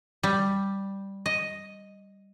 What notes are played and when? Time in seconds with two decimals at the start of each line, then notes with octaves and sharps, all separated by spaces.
0.23 G3
1.26 D#5